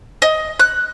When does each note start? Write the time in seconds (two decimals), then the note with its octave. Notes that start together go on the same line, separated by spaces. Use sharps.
0.22 D#5
0.60 F#6